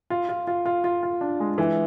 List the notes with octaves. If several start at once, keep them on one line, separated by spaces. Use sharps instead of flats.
F4
F4
F4
F4
F4
F4
D4
G#3
E3